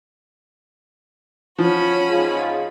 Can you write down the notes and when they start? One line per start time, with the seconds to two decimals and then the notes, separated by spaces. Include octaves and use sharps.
1.59 F3 C#4 F#4 B5
2.09 G#2 F4 G#4